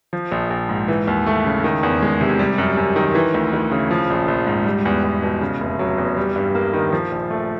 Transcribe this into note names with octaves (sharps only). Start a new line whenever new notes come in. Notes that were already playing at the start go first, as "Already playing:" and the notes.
F3
A#1
A#1
G#2
E3
D#2
A3
C#3
D#3
E2
G#3
C3
G3
F#2
F#2
D#3
E3
D2
D2
C#3
F3
A#1
A#1
G#2
G3
E2
E2
B2
C#3
F1
F#3
E2
G3
G2
A#3
D#3
F3
A#1
A3